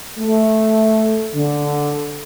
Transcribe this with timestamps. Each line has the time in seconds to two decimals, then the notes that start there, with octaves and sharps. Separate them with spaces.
0.19 A3
1.34 D3